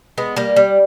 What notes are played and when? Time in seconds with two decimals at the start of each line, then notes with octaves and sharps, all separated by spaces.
0.18 G#3 B3
0.36 G3 A#3
0.56 G3